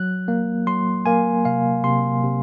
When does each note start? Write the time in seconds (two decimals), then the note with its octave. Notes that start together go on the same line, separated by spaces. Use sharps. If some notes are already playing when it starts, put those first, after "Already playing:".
Already playing: F#3 F#6
0.28 A#3
0.67 F#3 C6
1.06 A#3 G#5
1.45 C3 F5
1.84 C3 C6
2.23 C3